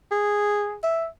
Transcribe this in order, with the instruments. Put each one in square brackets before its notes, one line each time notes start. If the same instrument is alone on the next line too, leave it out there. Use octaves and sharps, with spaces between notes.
[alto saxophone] G#4
E5